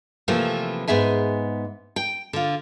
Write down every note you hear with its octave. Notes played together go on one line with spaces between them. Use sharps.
C3 E3 F3 A3 A#3
G#2 B3 G#4 E5 G#5
G5
D3 F4